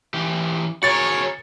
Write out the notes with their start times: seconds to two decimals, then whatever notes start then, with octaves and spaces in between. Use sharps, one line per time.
0.14 E3 G4
0.83 F#4 G#4 A#4 C#5 A6 C#7